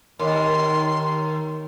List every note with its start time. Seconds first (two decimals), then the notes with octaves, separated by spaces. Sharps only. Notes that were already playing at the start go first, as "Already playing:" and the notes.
0.19 D#2 D#3 A#4 C#5 D#5 C6